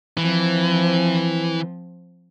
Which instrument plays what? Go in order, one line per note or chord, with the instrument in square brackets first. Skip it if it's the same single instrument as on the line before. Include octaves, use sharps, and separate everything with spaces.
[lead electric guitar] E3 [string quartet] F3 C4